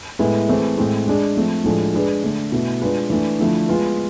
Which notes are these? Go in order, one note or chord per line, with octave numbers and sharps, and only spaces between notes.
A2 G#3 B3 E4
E3 A3 C4 G#4 C5
A2 G#3 C4
G#3 D4 G#4
F3 A3 C4
A2 F3 G#3 D4 A4
G#3 D4 G#4 B4
D3 A3 D4
B2 A3 E4
G#3 D4 F4 B4
E3 A3 D4
D3 F3 A3 E4
G#3 B3 F4